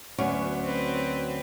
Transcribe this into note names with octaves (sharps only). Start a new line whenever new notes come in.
D2 F#3 B3 C#4
C4 B4